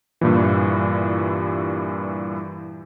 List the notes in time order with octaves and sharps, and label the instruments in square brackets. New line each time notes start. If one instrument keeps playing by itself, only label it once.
[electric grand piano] G2 A#2 E3